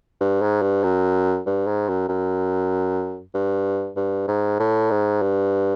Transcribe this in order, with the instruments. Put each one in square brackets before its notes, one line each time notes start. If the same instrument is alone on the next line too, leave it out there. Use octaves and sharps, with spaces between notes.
[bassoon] G2
G#2
G2
F#2
G2
G#2
F#2
F#2
G2
G2
G#2
A2
G#2
G2